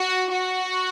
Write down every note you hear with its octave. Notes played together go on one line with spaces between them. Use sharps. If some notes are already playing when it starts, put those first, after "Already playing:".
Already playing: F#4
F#4